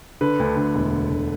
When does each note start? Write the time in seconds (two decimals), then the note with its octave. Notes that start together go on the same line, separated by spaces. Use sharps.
0.21 D3 B4
0.39 D2
0.57 D2
0.74 E1
0.92 E1
1.10 D2